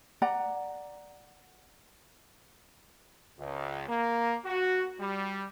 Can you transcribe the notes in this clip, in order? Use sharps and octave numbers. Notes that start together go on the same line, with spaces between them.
D5 F#5 A#5
C#2
A#3
F#4
G3